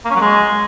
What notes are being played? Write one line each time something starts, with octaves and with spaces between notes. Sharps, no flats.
A#3
C#4
F#3
G#3